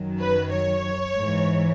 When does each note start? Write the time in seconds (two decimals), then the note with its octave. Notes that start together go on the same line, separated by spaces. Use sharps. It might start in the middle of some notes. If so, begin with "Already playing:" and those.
Already playing: F#2 D#3 F#3
0.20 B4
0.52 C#5
1.18 G#2 E3